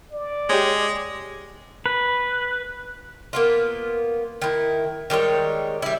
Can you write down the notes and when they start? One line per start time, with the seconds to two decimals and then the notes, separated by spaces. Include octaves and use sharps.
0.12 D5
0.49 G#3 G4 C#5
1.86 B4
3.33 A#3 B3 F4
4.41 D#3 E4
5.10 D#3 G3 G#3 C#5
5.82 G3 E4